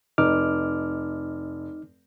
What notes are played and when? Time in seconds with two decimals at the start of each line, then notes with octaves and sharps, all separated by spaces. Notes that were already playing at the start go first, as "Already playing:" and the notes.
0.18 F1 D#4 D6 F6